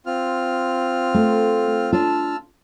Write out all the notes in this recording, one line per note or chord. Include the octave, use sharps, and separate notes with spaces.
C4 F4 F6
A3
D4 F4 A5 E6 F6